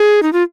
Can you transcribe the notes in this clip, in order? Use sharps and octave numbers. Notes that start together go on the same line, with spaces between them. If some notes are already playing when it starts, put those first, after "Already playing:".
Already playing: G#4
D#4
F4